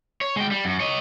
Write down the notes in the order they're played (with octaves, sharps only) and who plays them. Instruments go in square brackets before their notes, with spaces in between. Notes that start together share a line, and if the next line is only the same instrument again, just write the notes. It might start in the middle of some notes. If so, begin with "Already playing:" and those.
[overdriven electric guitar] C#5
G#3 G5
G3
F#2
C#5 D#5